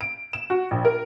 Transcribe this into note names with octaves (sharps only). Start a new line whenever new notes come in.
D7
E7
F#4
A#1
A#4